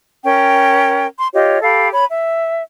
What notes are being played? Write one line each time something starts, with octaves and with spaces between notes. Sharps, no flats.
C#4 A#4 G5
C6
F4 G4 C#5 D#5
G4 A4 F5 B5
C#5 B5
E5